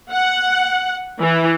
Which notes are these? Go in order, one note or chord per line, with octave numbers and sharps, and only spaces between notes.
F#5
E3